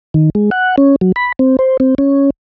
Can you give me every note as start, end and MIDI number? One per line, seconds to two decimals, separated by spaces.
0.14 0.30 51
0.35 0.50 56
0.51 0.76 78
0.78 0.96 61
1.01 1.12 54
1.16 1.32 83
1.39 1.57 60
1.59 1.77 72
1.80 1.95 60
1.98 2.30 61